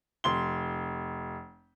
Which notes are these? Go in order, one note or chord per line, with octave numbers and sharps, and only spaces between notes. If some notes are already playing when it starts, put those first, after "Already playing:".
F1 C6 G7